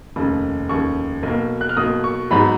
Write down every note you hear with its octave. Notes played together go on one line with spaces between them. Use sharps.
F1 D#2 C#3
F1 D#2 C#3 C#6
B1 B2 A#3
F#6
F6
B1 B2 A#3 D#6
C#6
G#1 G#2 F#3 B3 B5